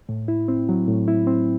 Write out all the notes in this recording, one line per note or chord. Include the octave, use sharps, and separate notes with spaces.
A2
E4
C4
F#3
A2
E4
C4